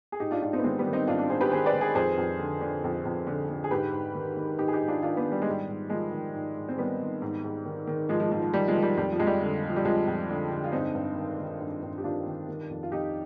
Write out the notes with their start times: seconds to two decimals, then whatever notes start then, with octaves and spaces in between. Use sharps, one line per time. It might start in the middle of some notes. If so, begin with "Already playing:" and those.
0.12 G#4
0.20 G#2 D#4 G4
0.31 D4 F4
0.42 G#2 D4 F4
0.53 C4 D#4
0.59 B3
0.64 D#3 G#3 C4
0.79 G3 B3
0.86 D#3
0.93 C4 D#4
1.07 G#2 D4 F4
1.19 D4 F4
1.30 G#2 G#4 C5
1.41 G4 B4
1.51 D#3 G#4 C5
1.66 B4 D5
1.74 D#3
1.81 G#4 C5
1.95 F2 G#4 C5
2.17 F2
2.39 D3
2.61 D3
2.84 F2
3.05 F2
3.27 D3
3.49 D3
3.64 G#4
3.71 G#2 G4 B4
3.93 G#2
4.15 D#3
4.37 D#3
4.58 G#2 D#4 G4
4.68 G#4
4.73 D#4 G4
4.81 G#2
4.88 D4 F4
5.02 D#3 D4 F4
5.17 B3 D4
5.24 D#3
5.32 G3
5.42 G#3
5.47 G#2 G3
5.68 G#2
5.90 D#3 F3 G#3
6.12 D#3
6.34 G#2
6.56 G#2
6.69 C4
6.77 D#3 G3 B3
7.00 D#3
7.22 G#2
7.44 G#2
7.65 D#3
7.87 D#3
8.09 G#2 F3 G#3
8.20 F3 G#3
8.31 G#2 F3
8.42 F3
8.53 D#3 G3
8.68 F3 G#3
8.75 D#3
8.83 G3
8.97 F2 G3
9.12 F3
9.19 F2 G#3
9.27 G3
9.41 D3
9.63 D3
9.69 F3
9.76 G3
9.85 F2 F3 G#3
10.07 F2
10.29 D3
10.51 D3
10.64 F4
10.72 G2 C4 D#4
10.95 G2
11.16 D#3
11.38 D#3
11.61 G2
11.82 G2
11.98 G4
12.04 D#3 D4 F4
12.26 D#3
12.48 D#3
12.70 F2
12.83 F4
12.91 F2 D#4 G4